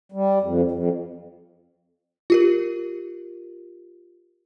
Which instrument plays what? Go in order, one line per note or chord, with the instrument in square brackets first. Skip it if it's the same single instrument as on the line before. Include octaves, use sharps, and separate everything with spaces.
[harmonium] G3
F2
F2
[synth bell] F4 G4 A#4